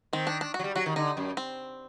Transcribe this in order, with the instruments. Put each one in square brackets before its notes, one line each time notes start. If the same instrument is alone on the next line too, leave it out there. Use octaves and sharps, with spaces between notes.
[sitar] D#3 [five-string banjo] C4
[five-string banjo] D4
D4
F#4
[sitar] F#3
G3
[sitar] F#3 [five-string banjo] F#4
[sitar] D#3
[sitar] D3 [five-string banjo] D#4
[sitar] F#2
[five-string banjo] C4